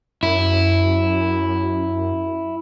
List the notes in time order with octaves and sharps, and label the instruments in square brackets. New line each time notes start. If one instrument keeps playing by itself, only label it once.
[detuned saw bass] F#2 [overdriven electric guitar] E4